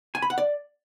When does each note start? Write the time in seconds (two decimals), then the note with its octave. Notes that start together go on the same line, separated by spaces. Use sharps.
0.15 G#5
0.22 B5
0.30 F#5
0.38 D5